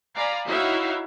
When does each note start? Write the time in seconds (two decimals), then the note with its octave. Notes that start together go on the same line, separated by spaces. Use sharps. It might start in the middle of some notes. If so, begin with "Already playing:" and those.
0.14 D5 F5 G#5 A#5 B5
0.47 D#4 E4 F#4 C#5 E5 F5